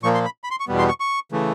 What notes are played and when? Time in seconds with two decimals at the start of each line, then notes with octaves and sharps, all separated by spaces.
0.03 A#2 F3 A#3 C#6
0.14 C6
0.25 B5
0.44 B5
0.51 C6
0.60 C#6
0.67 E2 B2 G3 B3
0.79 C6
0.88 C#6
1.00 C#6
1.32 C#3 E3 A3